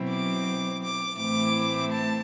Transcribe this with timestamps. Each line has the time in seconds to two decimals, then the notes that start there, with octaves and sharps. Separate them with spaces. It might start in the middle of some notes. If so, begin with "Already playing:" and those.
Already playing: B2 F#3 C4 E4
0.09 D6
0.82 D6
1.17 A2 E3 A3 C4 E4 D6
1.91 A5